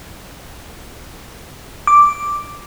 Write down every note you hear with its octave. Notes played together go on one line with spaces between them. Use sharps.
D6